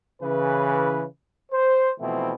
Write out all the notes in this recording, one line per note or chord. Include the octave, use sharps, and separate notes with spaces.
C#3 E3 B4
C5
B2 E3 F3 A3 C4 E4